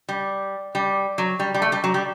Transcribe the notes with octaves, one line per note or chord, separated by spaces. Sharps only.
G3
G3
F#3
G3
G3
A3
G3
F#3
G3